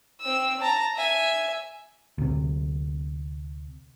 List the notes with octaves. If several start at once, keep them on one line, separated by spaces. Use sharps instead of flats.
C4 E6
A5 A#5
E5 G#5
D2 C3